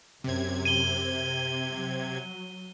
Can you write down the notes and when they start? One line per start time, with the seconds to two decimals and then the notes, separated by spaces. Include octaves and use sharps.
0.24 F#2 C3 G#6
0.65 D#7 G7
1.68 F#3